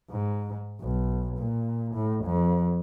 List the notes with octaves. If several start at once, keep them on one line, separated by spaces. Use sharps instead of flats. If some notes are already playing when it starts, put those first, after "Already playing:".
G#2
B1
A#2
A2
F2